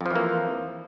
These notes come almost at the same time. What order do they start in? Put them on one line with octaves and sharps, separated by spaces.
F2 F3 E3 A#3